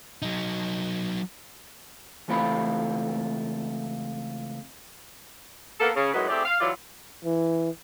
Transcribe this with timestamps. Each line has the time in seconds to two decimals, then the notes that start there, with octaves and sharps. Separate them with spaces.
0.22 F#3 D#4
2.28 C#2 E3 A3 C4 F4 B5
5.80 A#3 B3 A4
5.95 C#3
6.14 F#2 A2 F#3 G#3 D#4 B4
6.29 A3 C4 E4 G4 G#4 D5
6.45 F5
6.61 E3 F#3 E4 F4 G4 D5
7.25 E3